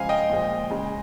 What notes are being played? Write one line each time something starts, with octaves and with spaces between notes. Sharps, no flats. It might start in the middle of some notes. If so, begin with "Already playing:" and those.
Already playing: C#3 F3 G#3 F5 G#5
D#5 G5
A#2 F3 G#3
C#3 G#3